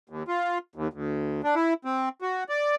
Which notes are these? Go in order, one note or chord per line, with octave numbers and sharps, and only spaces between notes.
D#2
F4
D#2
D2
D4
E4
C4
F#4
D5